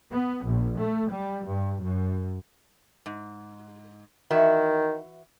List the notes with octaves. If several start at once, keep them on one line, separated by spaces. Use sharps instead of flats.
B3
A#1
A3
G3
G2
F#2
G#2
D#3 E3 F#4 E5